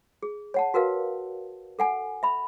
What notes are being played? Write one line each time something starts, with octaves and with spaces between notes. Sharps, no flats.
G#4
C#5 F#5 A5
F#4 A#4 B4 F5
A4 F#5 G#5
E5 B5